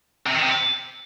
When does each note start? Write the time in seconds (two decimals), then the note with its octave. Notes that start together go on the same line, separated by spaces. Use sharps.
0.26 C3
0.35 D#3
0.42 C3